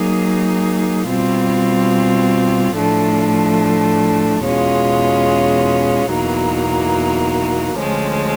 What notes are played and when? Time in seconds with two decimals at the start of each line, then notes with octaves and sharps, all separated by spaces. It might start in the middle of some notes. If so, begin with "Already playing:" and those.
Already playing: F#3 A#3 D#4 G#4
1.08 B2 G3 C4 F4
2.76 A2 F3 A3 D4
4.43 E2 B2 G#3 C#4 F4
6.11 E2 B2 F#3 A#3 D#4
7.78 D2 D3 F3 G#3 C#4